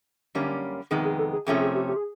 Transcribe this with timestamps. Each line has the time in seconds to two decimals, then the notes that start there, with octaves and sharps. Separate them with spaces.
0.35 F#2 D3 G3 A#3 C#4
0.91 F2 C3 D#3 G#3 B3 G#4
1.05 G#4
1.19 A4
1.33 G#4
1.46 F2 C3 F3 A3 C#4 G#4
1.61 G#4
1.75 G4
1.88 G4
1.96 G#4